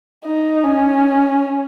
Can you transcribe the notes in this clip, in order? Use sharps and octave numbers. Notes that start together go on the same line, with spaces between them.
D#4
C#4